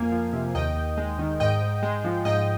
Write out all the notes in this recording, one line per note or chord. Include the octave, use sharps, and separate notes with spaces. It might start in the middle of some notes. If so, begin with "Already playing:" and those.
Already playing: F2 A#3 F5 G#5
F3
C3
D#2 D#5 G5
D#2
G#3
D#3
G#2 D#5 G5
G#2
G#3
F3
G#2 D#5 G5